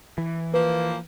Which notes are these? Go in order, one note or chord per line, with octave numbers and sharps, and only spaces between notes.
E3
F3 A#3 B4